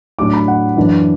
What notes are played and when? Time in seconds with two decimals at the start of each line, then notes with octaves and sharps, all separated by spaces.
0.18 A2 F#3 D4 D6
0.33 B5
0.48 F#5
0.77 F#2 E3 D4